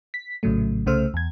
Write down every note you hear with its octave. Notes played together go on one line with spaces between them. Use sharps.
B6
A#1 A2 C#3 F#3 A3
C2 C#3 A3 C5 E6 F6
E2 G#6